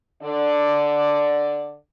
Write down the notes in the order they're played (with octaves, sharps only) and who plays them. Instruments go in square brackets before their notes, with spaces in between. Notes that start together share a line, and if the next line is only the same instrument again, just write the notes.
[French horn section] D3 D5